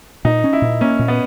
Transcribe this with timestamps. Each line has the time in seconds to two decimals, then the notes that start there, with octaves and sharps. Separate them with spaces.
0.25 A#2 D#4
0.44 C#4
0.53 E4
0.62 A#2
0.81 A#3 C#4
0.99 A#2
1.08 B3